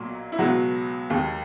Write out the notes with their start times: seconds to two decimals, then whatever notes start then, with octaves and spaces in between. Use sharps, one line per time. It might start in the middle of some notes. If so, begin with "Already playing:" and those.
Already playing: B1 A#2 F#3
0.32 E4
0.38 C#2 B2 F#3 G#3 F#4
1.10 D#2 D#3 G#3